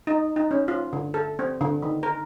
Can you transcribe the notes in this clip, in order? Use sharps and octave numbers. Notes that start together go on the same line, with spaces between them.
D#4
D#4
C#4
F4
D3
A4
C4
D3
D#3
A#4